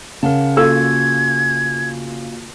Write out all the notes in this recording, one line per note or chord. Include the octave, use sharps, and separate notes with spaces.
C#3 A#4 F#5 A5
A#3 F4 F#4 A4 E6 G#6